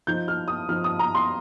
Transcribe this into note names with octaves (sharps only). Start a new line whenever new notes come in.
F3 D#4 G6
F6
D#6
F3 D#4 F6
D#6
A#5
C6